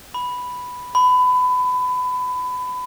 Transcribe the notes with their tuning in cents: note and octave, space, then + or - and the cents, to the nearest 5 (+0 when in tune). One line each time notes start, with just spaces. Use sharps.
B5 +0
B5 +25